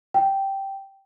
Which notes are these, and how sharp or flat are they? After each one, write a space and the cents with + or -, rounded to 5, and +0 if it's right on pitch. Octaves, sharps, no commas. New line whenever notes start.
G5 -5